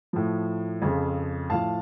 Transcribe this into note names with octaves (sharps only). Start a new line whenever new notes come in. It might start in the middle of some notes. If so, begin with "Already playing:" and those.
A2 F3
F2 C#3 F3
A2 F3 F5 A5